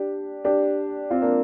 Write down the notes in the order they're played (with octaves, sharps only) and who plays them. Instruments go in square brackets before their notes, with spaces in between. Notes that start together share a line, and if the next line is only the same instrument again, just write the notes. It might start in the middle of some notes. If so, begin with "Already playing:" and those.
Already playing: [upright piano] D4 G4
D4 G4
C4 F4
A#3 D4